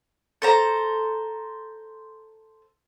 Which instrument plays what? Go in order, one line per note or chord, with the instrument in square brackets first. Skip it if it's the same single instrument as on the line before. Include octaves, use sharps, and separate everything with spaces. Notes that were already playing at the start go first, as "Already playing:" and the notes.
[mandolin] A4 C5 A#5